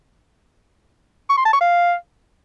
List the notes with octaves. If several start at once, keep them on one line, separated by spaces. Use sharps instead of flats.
C#6
C6
A5
C#6
F5